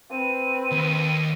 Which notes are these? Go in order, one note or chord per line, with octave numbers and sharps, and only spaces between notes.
C4 B4 D#7
D#2